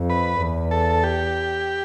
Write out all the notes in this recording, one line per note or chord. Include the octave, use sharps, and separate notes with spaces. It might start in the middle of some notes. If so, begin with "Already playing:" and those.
Already playing: F2
B4
E2
A4
G4